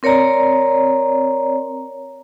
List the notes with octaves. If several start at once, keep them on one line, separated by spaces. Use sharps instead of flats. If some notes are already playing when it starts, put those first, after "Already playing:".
C4 A#4 C#5 D5 A#5